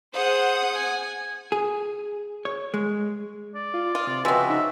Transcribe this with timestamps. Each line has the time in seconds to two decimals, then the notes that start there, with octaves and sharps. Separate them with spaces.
0.13 G#4 C5 F#5 D#6
0.75 G#5
1.52 G#4
2.45 C#5
2.74 G#3
3.55 D5
3.74 F4
3.95 F4 D#6
4.07 C3 D5
4.25 C#3 F3 G#3 C4 F#4 B4 E5
4.49 D#4 E5